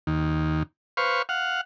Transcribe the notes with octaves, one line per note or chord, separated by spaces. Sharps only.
D#2
B4 C5 F5 C#6
F5 F#5